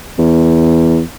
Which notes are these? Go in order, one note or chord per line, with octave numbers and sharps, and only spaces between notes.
E2